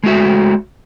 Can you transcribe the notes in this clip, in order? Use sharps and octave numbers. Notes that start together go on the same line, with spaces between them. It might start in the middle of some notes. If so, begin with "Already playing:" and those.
G#3 A3 F#4 E5